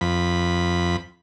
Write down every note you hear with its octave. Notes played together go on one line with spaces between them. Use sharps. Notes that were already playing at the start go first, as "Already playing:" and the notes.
F2 B5